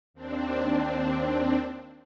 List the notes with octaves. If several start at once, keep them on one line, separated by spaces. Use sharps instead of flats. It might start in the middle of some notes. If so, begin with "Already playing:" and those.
D#2 C4 D4